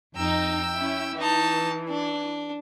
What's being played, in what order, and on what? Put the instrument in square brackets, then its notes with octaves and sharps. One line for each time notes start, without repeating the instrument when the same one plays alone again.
[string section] F2 D#4 [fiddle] G5 E6
[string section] C#4 E4
[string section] E3 [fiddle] D#4 A5
[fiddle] D4